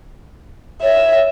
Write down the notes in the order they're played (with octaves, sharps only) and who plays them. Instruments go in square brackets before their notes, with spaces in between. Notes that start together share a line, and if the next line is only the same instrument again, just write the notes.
[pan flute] C#5 [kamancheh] E5